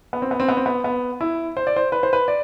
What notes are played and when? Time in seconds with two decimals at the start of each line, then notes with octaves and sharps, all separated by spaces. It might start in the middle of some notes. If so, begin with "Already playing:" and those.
0.13 B3
0.22 C4
0.31 B3
0.40 C4
0.49 B3
0.57 C4
0.66 B3
0.84 B3
1.21 E4
1.57 C5
1.67 D5
1.76 C5
1.92 B4
2.03 C5
2.13 B4
2.28 D5